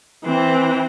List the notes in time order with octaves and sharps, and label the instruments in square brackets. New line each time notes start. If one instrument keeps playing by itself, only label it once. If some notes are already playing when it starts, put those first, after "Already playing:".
[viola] E3 C4